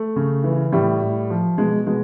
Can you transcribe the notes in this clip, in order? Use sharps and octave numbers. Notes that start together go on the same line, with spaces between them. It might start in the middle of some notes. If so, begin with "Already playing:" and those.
Already playing: A3
C#3
E3
A2 G3
A2
F3
B2 G#3
B2 G#3